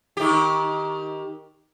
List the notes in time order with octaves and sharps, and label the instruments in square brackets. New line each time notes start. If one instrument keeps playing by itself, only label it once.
[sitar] D#3 G4